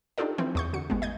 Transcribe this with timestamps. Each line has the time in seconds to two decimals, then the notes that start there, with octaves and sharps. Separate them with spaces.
0.18 D4 D#4 F4 G4 A4 D5
0.38 E3 F3 C4
0.55 E2 C#6 G6
0.73 D3 F#4 C#7
0.90 G#1 G#3 B3
1.02 D#5 G6 G#6